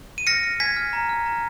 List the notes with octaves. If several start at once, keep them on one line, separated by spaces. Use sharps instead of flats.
D#7
F6 A#6 C#7
F6
G#5 G#6 B6
F6
A#5
F6
A#5